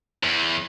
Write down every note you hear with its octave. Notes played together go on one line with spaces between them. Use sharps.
E2